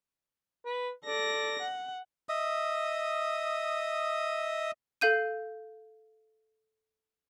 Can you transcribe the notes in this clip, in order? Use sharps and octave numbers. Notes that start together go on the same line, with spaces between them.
B4
A4 D5 A#6
F#5
D#5 E5 D#6
A4 F5 G6 D#7